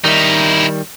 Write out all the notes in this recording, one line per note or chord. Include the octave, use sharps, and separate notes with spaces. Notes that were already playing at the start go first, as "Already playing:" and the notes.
D#3 G3 D#4 E4